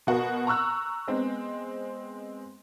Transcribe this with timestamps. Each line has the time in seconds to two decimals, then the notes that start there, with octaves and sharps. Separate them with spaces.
0.07 B2 F#4 A#4
0.47 A#5 C#6 E6 F#6
1.08 G#3 B3 C4